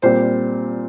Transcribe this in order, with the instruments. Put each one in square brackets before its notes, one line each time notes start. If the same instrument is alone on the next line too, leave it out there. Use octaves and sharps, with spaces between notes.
[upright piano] A#2 G3 C4 [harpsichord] C5